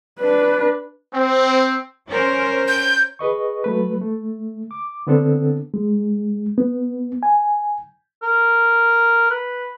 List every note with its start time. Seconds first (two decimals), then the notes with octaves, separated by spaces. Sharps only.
0.20 D4 B4
1.14 C4
2.09 C#4 A#4 C5
2.68 G6
3.19 G#4 B4 D#5 C#6
3.64 F#3 A3 B4
4.01 A3
4.71 D6
5.07 D3 B3 C4 D4 A4
5.74 G#3
6.58 B3
7.23 G#5
8.23 A#4
9.30 B4